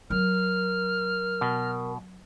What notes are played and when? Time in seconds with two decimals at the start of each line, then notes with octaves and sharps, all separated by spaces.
0.10 F#3 A#4 F6
1.41 B2